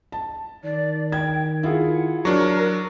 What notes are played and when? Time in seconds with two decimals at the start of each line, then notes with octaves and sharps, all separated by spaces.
0.12 A5
0.64 D#3 D5
1.12 G5 G#6
1.63 E4 F4 G#4 F#5
2.25 F#3 D4 A#4 C#6